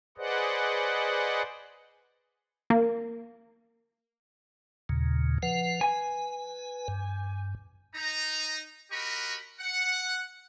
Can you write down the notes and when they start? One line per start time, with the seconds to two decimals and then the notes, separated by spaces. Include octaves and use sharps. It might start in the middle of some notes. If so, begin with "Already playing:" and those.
0.18 G#4 B4 C5 D5 D#5 F#5
2.70 A#3
4.89 D#2 A#2 C#3
5.43 F3 B4 F#5
5.81 B4 G#5
6.88 G2
7.95 D#4 A#5
8.91 F#4 G4 A#4 D#5 B5 C#6
9.60 F#5